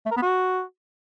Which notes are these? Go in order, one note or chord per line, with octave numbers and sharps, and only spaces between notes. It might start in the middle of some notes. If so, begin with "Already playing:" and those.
A3
A#4
B3
F#4